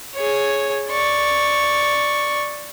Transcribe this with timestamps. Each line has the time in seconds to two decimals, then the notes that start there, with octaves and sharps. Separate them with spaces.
0.15 G#4 C#5
0.90 D5 C#6